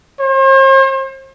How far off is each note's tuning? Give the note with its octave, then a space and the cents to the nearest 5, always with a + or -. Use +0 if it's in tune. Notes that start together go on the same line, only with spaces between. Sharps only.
C5 +45